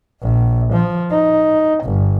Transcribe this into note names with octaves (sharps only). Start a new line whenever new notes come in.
A#1
F3
D#4
G1